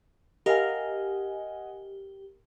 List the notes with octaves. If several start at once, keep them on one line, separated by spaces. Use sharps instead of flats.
G4 A#4 D#5 F5 F#5 G#5